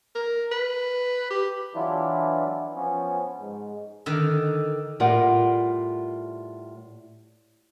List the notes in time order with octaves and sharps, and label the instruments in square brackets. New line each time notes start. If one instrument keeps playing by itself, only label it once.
[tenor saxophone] A#4
B4
G4
[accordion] E3 F#3 D4 E4 F4
F3 B3 C#4
G#2
[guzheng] D3 D#3
[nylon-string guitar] A2 G3 F4 A#4 F#5